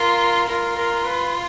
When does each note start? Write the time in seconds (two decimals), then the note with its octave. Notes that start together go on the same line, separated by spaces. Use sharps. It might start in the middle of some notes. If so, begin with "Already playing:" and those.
Already playing: F4 A#4
0.48 F4 A#4
0.76 A#4
1.05 B4